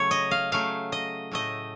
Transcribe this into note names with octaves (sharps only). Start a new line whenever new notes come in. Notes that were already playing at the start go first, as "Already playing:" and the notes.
Already playing: C#3 F#3 A3 C#5
D#5
F5
C#3 F#3 A3 F5
D#5
A2 A3 D#5